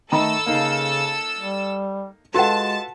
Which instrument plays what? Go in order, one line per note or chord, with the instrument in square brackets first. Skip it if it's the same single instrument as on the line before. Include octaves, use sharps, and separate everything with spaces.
[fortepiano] D#3 D#5 [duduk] A3 [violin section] A4 E6 [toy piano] A#5 B5
[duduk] C#3 [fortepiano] A#3 D#4 F5
[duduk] G3
[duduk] G#3 [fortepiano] F4 A4 B4 [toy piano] F#4 F#5 [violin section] A5